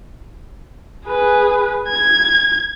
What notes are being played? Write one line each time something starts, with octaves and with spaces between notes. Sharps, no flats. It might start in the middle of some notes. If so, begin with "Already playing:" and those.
G#4 B4
G#6